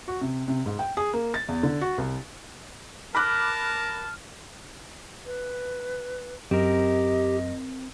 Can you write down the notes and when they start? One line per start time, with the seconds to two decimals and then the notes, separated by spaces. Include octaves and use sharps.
0.08 F#4
0.21 C3
0.48 C3
0.66 G#2
0.79 G5
0.97 G#4
1.13 A#3
1.34 A6
1.48 E2
1.63 D3
1.81 F#4
1.98 C2
3.15 A#4 A5 B5 D6 F6 F#6
5.26 B4
6.51 F#2 C4 G4 A#4 D#5